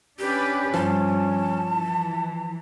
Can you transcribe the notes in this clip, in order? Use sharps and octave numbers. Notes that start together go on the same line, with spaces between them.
C#4 D4 G4 B4
G2 F3 A5
E3